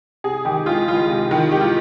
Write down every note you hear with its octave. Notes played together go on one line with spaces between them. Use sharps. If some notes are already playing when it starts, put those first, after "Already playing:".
C3 G#4
D#3 G4
G#3 F4
C#2 F4
C3
D#3
G#3 G4
F4